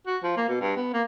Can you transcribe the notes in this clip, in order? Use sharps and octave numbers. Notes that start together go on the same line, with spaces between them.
F#4
F3
A#3
B2
G2
B3
A#3